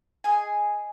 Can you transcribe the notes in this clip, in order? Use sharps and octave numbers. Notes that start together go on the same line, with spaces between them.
G#4 D#5 G#5